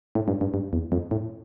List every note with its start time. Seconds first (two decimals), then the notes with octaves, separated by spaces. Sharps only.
0.15 A2
0.28 G2
0.41 G2
0.54 G2
0.73 E2
0.92 F2
1.11 A2